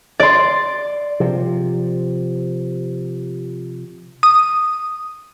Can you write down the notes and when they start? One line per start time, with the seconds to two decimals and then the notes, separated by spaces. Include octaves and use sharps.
0.20 D5 C6
1.20 C3 F3
4.23 D#6